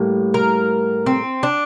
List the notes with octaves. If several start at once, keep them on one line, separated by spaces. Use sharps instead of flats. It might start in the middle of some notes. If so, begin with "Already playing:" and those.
Already playing: A2 G3 A#3
A#4
C4
D4